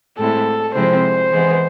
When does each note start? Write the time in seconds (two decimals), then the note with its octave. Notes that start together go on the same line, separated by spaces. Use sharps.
0.19 A2 G#3 C4 E4 A4
0.75 C3 F3 G#3 C4 E4 C5
1.31 E3 G#3 B3